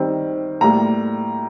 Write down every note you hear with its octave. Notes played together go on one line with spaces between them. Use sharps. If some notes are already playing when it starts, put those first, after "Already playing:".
Already playing: D#3 G3 C4
A2 G3 A#3 A#5